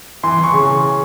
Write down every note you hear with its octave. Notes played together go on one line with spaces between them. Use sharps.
E3 C6
E3
C#6
C#3